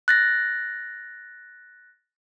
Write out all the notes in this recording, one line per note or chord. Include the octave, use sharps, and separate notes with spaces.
F#6 A6 A#6